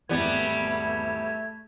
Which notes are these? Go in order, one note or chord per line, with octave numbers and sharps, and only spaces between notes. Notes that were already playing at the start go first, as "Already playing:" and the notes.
G#1 E2 E3 G3 A3 B3 G#6